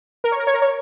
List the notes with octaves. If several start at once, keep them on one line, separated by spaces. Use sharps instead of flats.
A#4
C#5
A#4
C#5
A#4
C#5